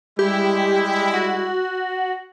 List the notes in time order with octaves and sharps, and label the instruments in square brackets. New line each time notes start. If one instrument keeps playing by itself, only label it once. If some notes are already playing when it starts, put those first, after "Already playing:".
[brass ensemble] G3 G#3 E4 [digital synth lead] G4
[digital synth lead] F#4